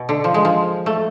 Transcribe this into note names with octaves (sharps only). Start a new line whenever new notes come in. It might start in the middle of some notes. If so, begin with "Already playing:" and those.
Already playing: B2
D3
F3
G#3
F3
A3